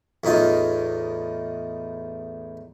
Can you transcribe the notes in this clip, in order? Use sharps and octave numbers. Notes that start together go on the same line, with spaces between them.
E2 A2 D#4 F4